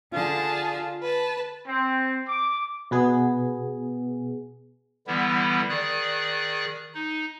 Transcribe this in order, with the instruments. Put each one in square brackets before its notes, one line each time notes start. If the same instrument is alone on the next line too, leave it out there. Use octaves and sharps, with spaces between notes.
[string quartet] D3 G#4 A5 [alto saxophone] F4
[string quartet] B4 A5
[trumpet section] C4
D6
[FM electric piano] B2 B3 G#4
[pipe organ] D3 E3 G3 B3 E4
D#3 G#4 D5 F#6
D#4